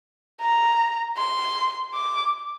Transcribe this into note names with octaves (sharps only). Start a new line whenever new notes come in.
A#5
C6
D6